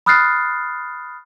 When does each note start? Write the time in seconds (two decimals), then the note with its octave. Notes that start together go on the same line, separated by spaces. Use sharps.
0.06 B5 D#6 F6 F#6 A6 C7